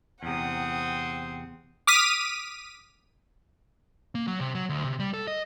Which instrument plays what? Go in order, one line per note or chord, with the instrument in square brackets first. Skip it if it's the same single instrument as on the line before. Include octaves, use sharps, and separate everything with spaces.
[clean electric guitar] E2 C3 [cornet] C4 [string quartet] F#5 D#6
[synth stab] D6 D#6 F6 B6 D#7
[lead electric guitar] A#3
F#3
C3
F#3
D2
C3
G3
A4
D#5